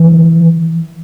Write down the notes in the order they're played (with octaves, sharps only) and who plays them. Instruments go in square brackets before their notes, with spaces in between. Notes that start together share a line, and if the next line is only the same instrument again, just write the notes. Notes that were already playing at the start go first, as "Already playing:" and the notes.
Already playing: [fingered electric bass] E3